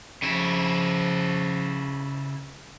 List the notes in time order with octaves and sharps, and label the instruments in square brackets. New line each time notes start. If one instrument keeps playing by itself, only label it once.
[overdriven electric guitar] C#3 E4 [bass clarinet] F3